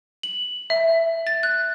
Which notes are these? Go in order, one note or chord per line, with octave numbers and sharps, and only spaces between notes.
F#7
E5
A6
F#6